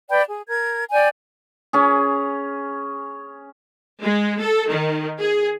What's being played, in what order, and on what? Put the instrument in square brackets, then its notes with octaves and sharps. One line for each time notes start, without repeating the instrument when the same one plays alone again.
[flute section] B4 D5 G5 B5
G#4
A#4 G#6
D5 G5 G#5 G6
[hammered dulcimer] C#4 G#4
[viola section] G#3
A4
D#3
G#4